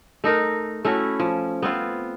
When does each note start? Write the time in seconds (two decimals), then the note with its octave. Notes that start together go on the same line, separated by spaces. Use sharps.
0.24 A3 D#4 A#4
0.85 A3 C#4 E4 F#4
1.20 F3
1.62 B3 C4 F4